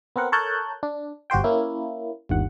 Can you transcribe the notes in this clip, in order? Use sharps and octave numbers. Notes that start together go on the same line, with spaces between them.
B3 C4 A#4 F#5
A4 A#4 C#5 A5 F#6 G6
D4
G1 F#4 G4 C5 G5
A#3 C#4 E4
G1 D#2 F#5